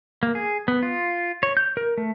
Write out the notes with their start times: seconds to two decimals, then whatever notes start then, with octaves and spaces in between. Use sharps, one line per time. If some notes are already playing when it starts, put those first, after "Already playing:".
0.23 A#3
0.35 G#4
0.68 B3
0.83 F4
1.43 C#5
1.57 G6
1.77 A#4
1.98 A3